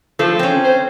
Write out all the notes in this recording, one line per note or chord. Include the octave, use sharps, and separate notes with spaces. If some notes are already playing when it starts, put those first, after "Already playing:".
F3 A4
C4 C#4
C5